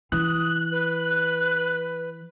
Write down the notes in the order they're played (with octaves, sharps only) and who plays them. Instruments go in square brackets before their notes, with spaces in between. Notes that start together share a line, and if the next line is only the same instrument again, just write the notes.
[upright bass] E3 [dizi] D#6 [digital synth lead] F#6
[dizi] B4